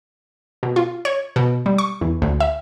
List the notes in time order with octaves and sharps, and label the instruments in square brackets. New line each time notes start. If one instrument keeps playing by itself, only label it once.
[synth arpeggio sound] B2
F4
C#5
B2
G3
C#6
E2
D2
E5